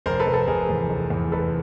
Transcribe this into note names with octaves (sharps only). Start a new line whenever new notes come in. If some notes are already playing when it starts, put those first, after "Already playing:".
F1 A#4 C5
A4 B4
F1
A4 B4
F1 G#4 A#4
E2
F1
E2
F1 A4 B4